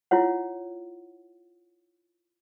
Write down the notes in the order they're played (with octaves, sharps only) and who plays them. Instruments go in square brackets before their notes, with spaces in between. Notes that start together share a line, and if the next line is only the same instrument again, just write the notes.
[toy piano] E4 F4 C#5 F#5